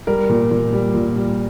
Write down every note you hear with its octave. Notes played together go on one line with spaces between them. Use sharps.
G3 A#4
A#2
A#2
G3
A#2
G3